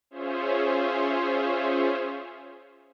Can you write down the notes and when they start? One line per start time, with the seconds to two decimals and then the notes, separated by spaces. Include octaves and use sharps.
0.11 C#4 F4 G#4 C5 C#5 E5